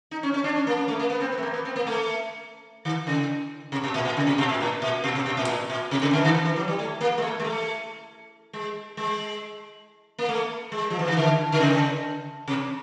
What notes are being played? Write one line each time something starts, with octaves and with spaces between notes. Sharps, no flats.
D#4
C#4
C#4
D4
C#4
A#3
A#3
A3
A#3
B3
C4
B3
A3
A#3
B3
C4
A#3
A3
D#3
C#3
C3
B2
A#2
A#2
C#3
C3
B2
A#2
A2
A#2
B2
C3
B2
A#2
A2
A#2
C3
C#3
D3
E3
D#3
E3
E3
F#3
G3
A3
A#3
G#3
A3
G#3
A3
G#3
G#3
A#3
A3
G#3
F3
E3
D#3
D3
D3
C#3
C3